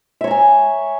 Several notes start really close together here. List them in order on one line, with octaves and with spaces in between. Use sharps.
E5 C#5 A#5 G#5